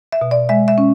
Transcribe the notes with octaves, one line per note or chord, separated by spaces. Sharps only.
E5
B2
D5
G#3 E5
E5
C#4